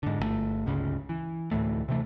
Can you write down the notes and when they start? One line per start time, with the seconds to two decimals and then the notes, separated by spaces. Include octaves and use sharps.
0.03 G#2 D3
0.19 G1 C3 A3
0.66 G1 C#2 C#3
1.09 E3
1.51 D2 A2 E3 A3
1.88 C3 E3 A3